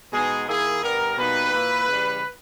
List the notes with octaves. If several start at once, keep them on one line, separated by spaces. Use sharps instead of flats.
B2 G#3 B3 D#4 G#4
D#3 A#3 E4 G#4
G2 G3 B3 A#4
B2 G3 A#3 D#4 B4
A#2 A#3 E4
C#3 E3 G3